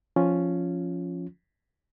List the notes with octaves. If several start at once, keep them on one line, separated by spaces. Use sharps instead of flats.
F3 C#4 F4